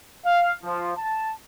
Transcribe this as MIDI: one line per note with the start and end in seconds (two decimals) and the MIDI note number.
0.24 0.51 77
0.63 0.91 53
0.97 1.31 81